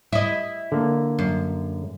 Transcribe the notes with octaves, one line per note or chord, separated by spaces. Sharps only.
E4 D#5
D3 A#3
F#2